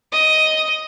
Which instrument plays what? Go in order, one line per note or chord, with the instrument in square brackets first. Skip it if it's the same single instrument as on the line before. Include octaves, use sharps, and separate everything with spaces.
[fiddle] D#5